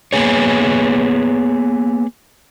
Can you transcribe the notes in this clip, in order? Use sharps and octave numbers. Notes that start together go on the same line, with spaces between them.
A#3 B3 G#4 C#5